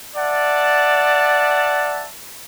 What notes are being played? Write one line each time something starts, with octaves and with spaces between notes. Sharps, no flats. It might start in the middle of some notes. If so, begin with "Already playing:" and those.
D5 E5 F#5 A5